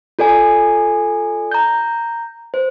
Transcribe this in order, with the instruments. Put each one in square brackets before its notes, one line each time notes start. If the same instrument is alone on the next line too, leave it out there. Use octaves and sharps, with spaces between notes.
[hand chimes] F4 A4 D5 G#5
A#5 G6
C5